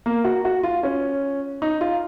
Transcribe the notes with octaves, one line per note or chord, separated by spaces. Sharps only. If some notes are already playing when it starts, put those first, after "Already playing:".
A#3
F#4
F#4
F4
C#4
D#4
F4